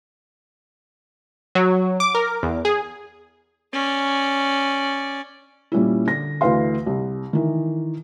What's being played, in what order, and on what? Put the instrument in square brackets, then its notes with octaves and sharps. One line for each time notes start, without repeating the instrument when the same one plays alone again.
[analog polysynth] F#3
D6
A#4
E2
G#4
[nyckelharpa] C#4 D5
[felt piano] A#2 G3 C#4 E4
D3 A#6
D2 D3 E3 B4 F5 C6
C2
D#3 E3